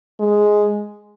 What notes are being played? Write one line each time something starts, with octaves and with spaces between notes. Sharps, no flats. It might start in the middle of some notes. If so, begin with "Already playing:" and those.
G#3